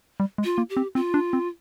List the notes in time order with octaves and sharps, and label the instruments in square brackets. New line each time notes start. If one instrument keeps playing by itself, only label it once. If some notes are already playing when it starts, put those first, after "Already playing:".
[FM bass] G3
G#3
[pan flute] F4
[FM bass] A#3
[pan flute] G4
[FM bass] C4
[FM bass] C4 [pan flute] F4
[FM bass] D4
C4